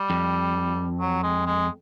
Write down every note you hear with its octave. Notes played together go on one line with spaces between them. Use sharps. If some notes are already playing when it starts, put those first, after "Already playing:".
Already playing: G3
F2
F#3
G#3
G#3